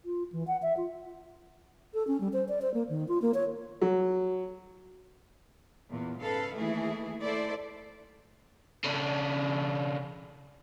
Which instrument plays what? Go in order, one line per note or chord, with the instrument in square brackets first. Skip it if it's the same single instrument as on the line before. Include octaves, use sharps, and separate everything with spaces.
[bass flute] F4
E3
F#5
E5
F4
A4
C#4
G3
C5
D5
C5
A#3
D#3
F4
A#3
C#5
[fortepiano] F#3
[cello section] E2 A#2
G#2 C#3 A4 B4 F5
D#2 E3 A3 E4 G#4
A3 E4 A4 C5 D5
[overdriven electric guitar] C#3 D4